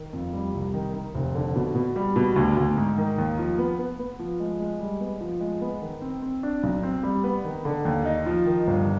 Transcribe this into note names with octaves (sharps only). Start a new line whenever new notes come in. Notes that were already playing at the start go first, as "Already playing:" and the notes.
Already playing: D#3
F2
G3
C2
D#3
D#3
F1
D3
B2
B2
G3
B2
D2
D2
G#2
D#3
D#2
F3
B3
B3
B3
F3
G#3
G#3
G3
B3
F3
G#3
B3
D#3
C4
C4
D4
B1
C4
G3
B3
D#3
D3
D#2
D#4
F3
D#3
G1